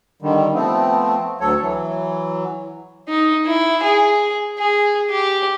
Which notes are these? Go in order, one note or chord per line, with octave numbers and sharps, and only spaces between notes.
D3 D#3 G3
F3 A3 B3 C4
D2 F#3 A4 C#5
E3 F#3
D#4
E4
G#4
G#4
G4